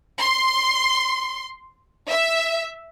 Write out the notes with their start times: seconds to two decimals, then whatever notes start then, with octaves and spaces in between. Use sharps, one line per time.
0.20 C6
2.08 E5